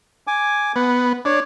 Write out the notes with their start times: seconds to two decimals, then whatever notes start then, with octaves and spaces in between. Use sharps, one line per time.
0.27 G#5 D6
0.76 B3 F#5
1.25 D4 C#5